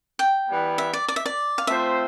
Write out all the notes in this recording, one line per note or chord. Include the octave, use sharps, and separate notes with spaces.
G5
E3 G3 B3
E5
D5
D5
E5
D5
F5
A3 C4 F4 C5 E5